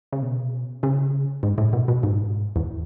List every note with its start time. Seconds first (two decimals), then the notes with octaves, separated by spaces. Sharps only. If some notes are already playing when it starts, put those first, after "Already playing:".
0.12 C#3
0.22 B2
0.83 C#3
1.43 G#2
1.58 A2
1.73 B2
1.88 B2
2.03 G#2
2.56 E2